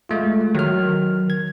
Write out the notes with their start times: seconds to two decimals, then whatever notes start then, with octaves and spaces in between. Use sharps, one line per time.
0.09 G#3 A3 F4
0.55 D#3 F#3 F6
1.30 G#6